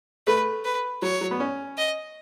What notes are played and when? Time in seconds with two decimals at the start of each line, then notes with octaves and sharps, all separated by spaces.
0.27 A3 B4
0.65 B4
1.02 F#3 C#5
1.21 F#3
1.31 B3
1.40 C#4
1.78 D#5